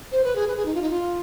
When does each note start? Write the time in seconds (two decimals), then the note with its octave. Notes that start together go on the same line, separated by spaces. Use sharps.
0.12 C5
0.24 B4
0.35 G#4
0.47 B4
0.56 G#4
0.66 D#4
0.75 F4
0.82 D#4
0.90 F4